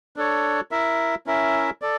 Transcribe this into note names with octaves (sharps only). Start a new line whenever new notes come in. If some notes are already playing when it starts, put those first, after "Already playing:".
D4 A4 C#5
E4 A#4 E5
C#4 E4 A#4 E5
A4 D5